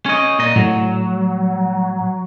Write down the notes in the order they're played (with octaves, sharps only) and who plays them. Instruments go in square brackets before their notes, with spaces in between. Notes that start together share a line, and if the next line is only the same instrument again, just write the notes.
[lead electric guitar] C#4 D#5
A#2 D#5
[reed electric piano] A2 [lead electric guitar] F#3